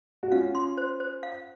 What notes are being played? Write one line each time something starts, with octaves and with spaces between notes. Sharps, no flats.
F#4
C#4 F4 F5
C6
C5
C5
F5